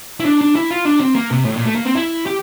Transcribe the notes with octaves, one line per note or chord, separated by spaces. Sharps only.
E4
D4
D4
E4
F4
D4
C4
A#3
C3
A2
A#2
A3
A#3
C4
E4
G4